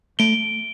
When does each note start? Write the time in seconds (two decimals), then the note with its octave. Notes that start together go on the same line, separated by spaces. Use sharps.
0.19 A3 D7 G7